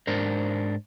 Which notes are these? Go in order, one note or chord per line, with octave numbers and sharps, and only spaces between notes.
G#2 D4 A#4 C5